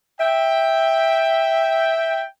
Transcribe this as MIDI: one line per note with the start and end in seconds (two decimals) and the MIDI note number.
0.20 2.23 76
0.20 2.23 79